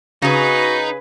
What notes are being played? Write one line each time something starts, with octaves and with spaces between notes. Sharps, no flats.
C#3 D#4 F#4 G#4 B4